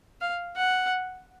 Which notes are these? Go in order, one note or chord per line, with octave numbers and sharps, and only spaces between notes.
F5
F#5